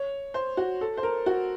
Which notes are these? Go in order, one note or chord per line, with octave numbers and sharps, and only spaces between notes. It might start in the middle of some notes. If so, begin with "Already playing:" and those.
Already playing: C#5
C5
F#4
A4
C5
A#4
F#4